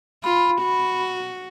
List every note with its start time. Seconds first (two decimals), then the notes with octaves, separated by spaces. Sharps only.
0.24 F4 B5
0.61 F#4